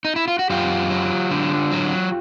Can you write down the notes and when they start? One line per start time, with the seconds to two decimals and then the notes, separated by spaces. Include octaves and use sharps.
0.05 D#4
0.16 E4
0.28 F4
0.39 F#4
0.50 F#2 F4 G4
0.91 F#3
1.31 D3
1.72 F#3